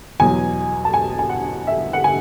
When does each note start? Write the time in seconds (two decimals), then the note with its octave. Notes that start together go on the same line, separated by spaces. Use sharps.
0.20 E2 B2 F#3 G#5
0.85 A5
0.94 G#5
1.19 G#5
1.29 F#5
1.67 E5
1.93 F#5
2.04 G#5